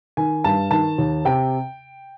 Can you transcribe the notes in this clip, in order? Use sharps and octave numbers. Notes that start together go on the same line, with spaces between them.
D#3 G#5
G2 A5
D#3 A5
D#2
C3 G5